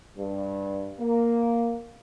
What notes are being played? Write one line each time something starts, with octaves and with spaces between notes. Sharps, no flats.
G2
A#3